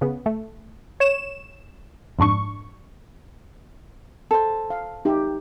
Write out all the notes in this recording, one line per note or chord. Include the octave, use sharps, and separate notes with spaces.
C#3 B3
A3
C#5 E7
F2 G#2 D4 C#6
A4 C5
F5
D#4 G4 E5